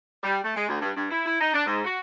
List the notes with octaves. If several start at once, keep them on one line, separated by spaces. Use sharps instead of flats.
G3
A3
G#3
D2
G2
G2
E4
E4
D#4
D4
G#2
F#4